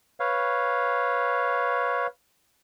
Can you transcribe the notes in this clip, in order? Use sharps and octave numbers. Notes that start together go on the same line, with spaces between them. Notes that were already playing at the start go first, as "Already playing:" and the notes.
B4 C#5 F5